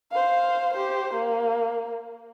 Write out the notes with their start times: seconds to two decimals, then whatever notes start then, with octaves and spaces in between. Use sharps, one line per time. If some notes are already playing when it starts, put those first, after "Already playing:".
0.12 C5 F5
0.73 G4 C5
1.13 A#3